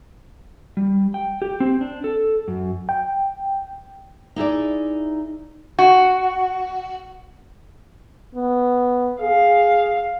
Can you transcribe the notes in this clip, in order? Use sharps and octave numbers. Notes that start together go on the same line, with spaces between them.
G3
G5
G4
C4
D4
A4
F#2
G5
D#4 E4 G#4 D5
F#4
B3
G#4 F5